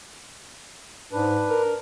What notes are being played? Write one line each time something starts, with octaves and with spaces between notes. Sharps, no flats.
G#2 D4 B4
A#4